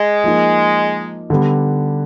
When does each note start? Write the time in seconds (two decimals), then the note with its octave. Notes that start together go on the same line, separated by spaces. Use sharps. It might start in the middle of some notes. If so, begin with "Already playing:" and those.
Already playing: G#3
0.24 F3 A#3 D#4
1.30 D3 G3 B3